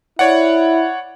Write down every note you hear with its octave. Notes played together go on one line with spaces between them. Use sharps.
E4 C#5 D5 F#5